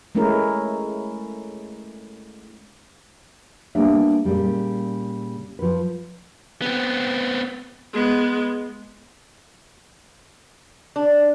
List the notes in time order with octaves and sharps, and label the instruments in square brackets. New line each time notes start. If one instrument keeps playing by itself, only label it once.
[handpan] G#3 A3 C#4 E4 A#4
[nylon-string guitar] G3 A#3 B3 D4 E5
A#2 C#3 G3
F3 B4
[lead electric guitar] B3 C4
[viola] G#3 B3
[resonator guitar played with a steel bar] D4